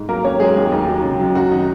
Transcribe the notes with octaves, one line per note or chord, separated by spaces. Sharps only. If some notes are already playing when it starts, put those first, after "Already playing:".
Already playing: G#2
F#3 A#3 A#4
D#2 C#4 C#5
F#3 G#3 G#4
D#2
D#2 D#4
F#3
C#3
F#3
F#2 F#4
D#3 D#4